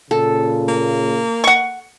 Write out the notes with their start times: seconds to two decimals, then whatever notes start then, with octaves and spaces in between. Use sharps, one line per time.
0.11 A#2 C#3 A4
0.68 A#3
1.44 F#5 C#6